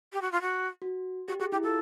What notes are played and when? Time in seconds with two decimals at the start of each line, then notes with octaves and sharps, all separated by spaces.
0.13 G4
0.22 F#4
0.32 F4
0.42 F#4
0.82 F#4
1.28 F#4 G4
1.40 F#4 G#4
1.52 E4 G4
1.63 F4 A4